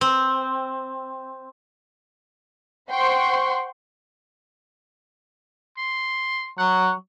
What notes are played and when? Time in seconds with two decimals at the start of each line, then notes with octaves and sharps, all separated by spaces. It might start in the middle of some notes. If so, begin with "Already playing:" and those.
0.01 C4
2.90 C5 F#5 G5 C6 C#6
5.78 C6
6.58 F#3 F#5